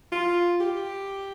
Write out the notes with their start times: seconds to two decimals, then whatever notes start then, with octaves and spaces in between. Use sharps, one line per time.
0.12 F4
0.61 G4